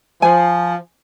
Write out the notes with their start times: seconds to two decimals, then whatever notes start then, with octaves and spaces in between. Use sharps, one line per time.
0.22 F3 G#5